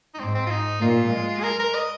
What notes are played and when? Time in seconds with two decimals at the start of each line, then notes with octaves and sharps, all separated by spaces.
0.14 D#4
0.20 G#2 C4
0.35 C4
0.47 F4
0.51 D#4
0.82 A#2 F4
1.13 G#3
1.39 G#4
1.43 A#4
1.60 A#4
1.75 D#5